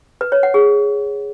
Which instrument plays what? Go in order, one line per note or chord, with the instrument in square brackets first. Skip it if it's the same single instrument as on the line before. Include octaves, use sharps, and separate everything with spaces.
[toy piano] B4
C#5
F#5
G#4